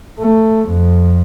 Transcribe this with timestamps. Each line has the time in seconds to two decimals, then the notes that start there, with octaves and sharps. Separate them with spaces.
0.20 A3
0.69 F2